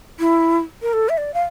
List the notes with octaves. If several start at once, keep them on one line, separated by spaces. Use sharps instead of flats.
E4
A#4
A4
E5
D5
F5